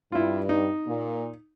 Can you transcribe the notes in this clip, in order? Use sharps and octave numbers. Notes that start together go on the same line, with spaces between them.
G2 E4 F4
D#4
A#2